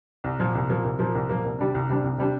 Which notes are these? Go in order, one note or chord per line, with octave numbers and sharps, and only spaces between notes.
C2
A#2 F3 A#3
C2
A#2 F3 A#3
C2
A#2 F3 A#3
C2
A#2 F3 A#3
C2
C3 G3 D4
C2
C3 G3 D4
C2
C3 G3 D4